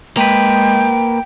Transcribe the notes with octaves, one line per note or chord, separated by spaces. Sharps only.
G#3 A#3 B4 G5